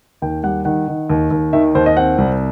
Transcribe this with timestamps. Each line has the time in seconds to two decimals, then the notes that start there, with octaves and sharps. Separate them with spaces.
0.22 D#2 G5
0.43 G3 F#5
0.65 D#3 F#5
0.88 D#3
1.10 D#2
1.31 D#2
1.53 D#3 E5
1.75 D#2 C5
1.86 D#5
1.97 C4 F#5
2.18 C2